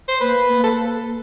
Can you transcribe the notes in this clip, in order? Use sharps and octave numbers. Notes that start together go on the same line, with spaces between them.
C5
A#3 B4
A#3
A4